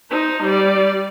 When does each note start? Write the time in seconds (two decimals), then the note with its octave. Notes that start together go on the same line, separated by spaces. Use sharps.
0.11 D#4 C5
0.43 G3 D5